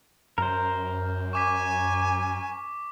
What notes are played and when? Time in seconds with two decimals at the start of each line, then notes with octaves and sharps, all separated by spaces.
0.38 F#2 A#4 C5
1.33 G#5 C#6 D6 B6